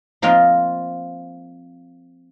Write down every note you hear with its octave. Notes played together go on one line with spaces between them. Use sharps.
F3 A#3 C4 F4 D#5 F5